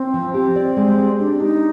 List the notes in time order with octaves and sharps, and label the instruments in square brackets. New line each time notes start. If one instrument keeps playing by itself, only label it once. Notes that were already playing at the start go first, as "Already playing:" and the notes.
Already playing: [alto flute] C4
[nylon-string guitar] F3
[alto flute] C4 [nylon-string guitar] G4
[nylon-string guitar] D5
G#3
D5
[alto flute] D4 [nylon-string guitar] G4
[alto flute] D#4 [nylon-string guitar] G4